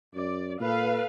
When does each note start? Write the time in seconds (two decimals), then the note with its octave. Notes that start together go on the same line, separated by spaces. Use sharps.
0.15 F#2 D5
0.60 A#2 A4 B4 F5